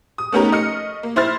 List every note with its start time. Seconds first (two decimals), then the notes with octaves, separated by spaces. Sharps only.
0.18 D#6
0.32 A3 B3 C#4 D#4 G4 A#4
0.52 A3 D#5 F6 C#7
1.03 A#3
1.16 E4 C5 E5 F6 A6